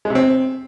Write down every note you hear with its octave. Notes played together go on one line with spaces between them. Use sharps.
G#3
C3
C4